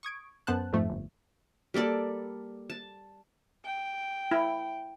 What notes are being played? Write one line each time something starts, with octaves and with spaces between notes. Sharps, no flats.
C#6 D#6 G#6 D7
F#2 B3 C5 A5 F#6
F2 G#2 F3 A3
G1
G3 A#3 A4 D5
A5
G5
E4